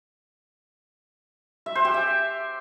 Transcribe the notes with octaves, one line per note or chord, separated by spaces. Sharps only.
E5
C5
G4
E5